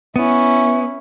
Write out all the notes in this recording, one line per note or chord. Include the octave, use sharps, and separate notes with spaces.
B3 C#4 E4